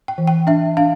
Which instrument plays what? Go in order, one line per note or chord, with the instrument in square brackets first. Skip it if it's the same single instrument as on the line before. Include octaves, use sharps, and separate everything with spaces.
[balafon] G5
E3
G5
D4 E5
D4 F5